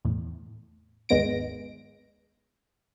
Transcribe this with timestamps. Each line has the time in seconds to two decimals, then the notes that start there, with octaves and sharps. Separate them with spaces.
0.05 E2 A2
1.09 G#1 D#2 G#3 B3 A#6 D7